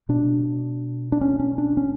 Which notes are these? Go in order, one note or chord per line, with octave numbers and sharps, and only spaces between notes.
B2 D4
D4
C#4
C#4
D4
C#4